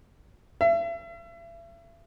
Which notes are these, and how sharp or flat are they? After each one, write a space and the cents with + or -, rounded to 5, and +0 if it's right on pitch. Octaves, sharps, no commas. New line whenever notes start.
E5 +40